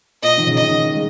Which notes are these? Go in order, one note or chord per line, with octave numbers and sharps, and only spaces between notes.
A#2 D#5
D#3
C#3
D#5
D#3
G#3